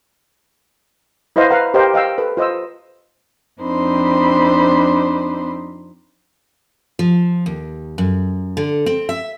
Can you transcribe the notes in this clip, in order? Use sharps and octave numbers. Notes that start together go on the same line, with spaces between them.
E4 B4 C5 D#5 F5
B4 F5 F#5 A#5
G4 A#4 C5 D#5 F5 G5
D#5 F5 G5 E6
A4 B4
F4 C5 D#5 D#6 E6
F2 C4 D4 D#4 C5 B5
F3
D#2
F#2
D3
C4
E5